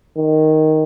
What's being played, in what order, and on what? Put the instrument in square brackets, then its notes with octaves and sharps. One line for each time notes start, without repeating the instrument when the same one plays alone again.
[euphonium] D#3